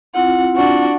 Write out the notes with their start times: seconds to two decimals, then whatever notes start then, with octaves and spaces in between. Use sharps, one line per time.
0.15 C4 E4 F4 F#5
0.56 D4 F#4